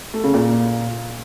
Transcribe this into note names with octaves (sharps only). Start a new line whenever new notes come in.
A3
C#3
A#2